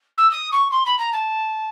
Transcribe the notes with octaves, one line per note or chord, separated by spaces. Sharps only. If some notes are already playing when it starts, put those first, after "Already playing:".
E6
D#6
C#6
C6
B5
A#5
A5